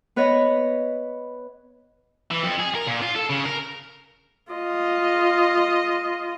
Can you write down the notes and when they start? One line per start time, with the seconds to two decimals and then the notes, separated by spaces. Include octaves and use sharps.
0.16 B3 B4 C#5 D#5
2.31 E3
2.43 F2
2.59 G#4
2.75 A#4
2.87 A#2
3.02 F4
3.15 A4
3.30 C#3
3.45 A#4
4.52 F4 D#5